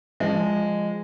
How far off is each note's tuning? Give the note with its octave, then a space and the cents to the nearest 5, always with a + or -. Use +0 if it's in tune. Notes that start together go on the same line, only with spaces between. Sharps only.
F3 +0 G#3 -15